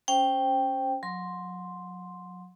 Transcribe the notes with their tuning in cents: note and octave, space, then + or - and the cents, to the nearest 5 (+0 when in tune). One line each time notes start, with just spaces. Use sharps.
C#4 +0 C5 +5 G5 +0
F#3 -30 C6 +0